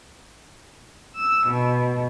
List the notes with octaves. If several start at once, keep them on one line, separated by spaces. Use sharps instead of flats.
E6
B2